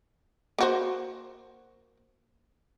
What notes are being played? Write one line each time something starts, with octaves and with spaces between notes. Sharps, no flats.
A#3 F#4 C5